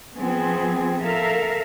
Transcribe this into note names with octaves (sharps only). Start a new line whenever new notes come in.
F3 B3 C4 G#4
A4 A#4 E5 F5